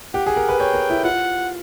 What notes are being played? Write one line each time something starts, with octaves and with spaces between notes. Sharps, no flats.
G4 F#5
G#4
A#4
B4
C#5 G5
A#4
E4
F4 F#5